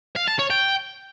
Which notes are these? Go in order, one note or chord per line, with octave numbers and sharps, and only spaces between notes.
F5
A5
C#5
G5